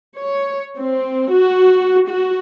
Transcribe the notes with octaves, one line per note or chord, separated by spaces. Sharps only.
C#5
C4
F#4
F#4